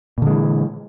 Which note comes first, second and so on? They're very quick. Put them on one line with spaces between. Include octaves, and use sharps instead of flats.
A#2 D3 G#3 E3